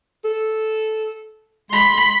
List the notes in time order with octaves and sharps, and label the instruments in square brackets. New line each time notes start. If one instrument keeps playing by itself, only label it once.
[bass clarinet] A4
[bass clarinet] G#3 [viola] B5 C6